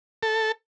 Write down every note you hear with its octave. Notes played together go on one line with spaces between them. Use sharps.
A4